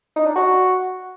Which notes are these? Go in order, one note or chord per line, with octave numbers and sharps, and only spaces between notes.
D#4
D4
F#4